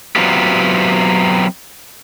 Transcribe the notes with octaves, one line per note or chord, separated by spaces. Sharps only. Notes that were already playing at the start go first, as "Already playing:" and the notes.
F#3 B3 C4 E4 F4 G4